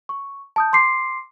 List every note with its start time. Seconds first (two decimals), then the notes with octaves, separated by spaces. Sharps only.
0.09 C#6
0.56 A5 D#6 G6
0.73 C6 D6 C7